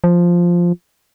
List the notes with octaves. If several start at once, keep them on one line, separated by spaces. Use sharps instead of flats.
F3